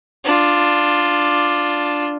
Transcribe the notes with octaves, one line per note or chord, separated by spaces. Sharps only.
D4 F4